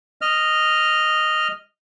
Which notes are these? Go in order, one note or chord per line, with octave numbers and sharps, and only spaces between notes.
D#5 F6